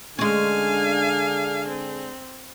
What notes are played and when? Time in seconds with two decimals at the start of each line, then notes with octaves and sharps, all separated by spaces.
0.19 D3 G#3 C#4 D4 G#4 F5 G#5
1.67 C4